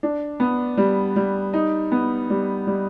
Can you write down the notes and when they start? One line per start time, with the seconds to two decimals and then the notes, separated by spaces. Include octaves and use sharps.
0.03 D4
0.40 B3
0.77 G3
1.16 G3
1.53 D#4
1.92 B3
2.30 G3
2.67 G3